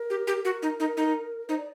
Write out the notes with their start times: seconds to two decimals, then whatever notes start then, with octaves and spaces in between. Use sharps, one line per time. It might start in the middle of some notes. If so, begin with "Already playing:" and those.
Already playing: A#4
0.10 G4
0.27 G4
0.44 F#4 A#4
0.62 D#4
0.80 D#4
0.97 D#4
1.48 D#4 C5
1.58 D5